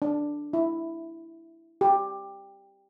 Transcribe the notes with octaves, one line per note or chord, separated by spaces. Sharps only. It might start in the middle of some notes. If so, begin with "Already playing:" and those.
D4
E4
G4